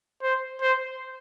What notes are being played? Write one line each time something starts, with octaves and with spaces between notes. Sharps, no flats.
C5
C5